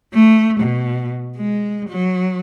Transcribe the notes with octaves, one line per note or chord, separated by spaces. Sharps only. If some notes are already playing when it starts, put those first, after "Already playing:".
A3
B2
G#3
F#3